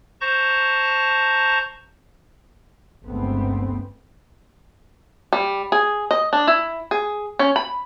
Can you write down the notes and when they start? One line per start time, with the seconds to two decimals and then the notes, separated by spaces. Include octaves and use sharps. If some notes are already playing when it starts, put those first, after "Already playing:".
0.21 C5 A5 A#5 C#6 G6 A#6
3.06 G1 C#2 A3 B3 C4
5.33 G3
5.72 G#4
6.11 D#5
6.33 D4
6.47 E4
6.91 G#4
7.39 C#4
7.56 B5